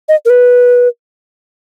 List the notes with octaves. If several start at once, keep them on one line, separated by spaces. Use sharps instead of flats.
D#5
A#4
B4